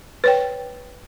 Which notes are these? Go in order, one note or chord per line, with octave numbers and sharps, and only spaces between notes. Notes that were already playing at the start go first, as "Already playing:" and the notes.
B4 C#5 G5